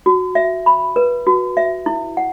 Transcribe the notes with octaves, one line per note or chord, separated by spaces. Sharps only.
F#4
E5
B5
B4
F#4
E5
E4
F#5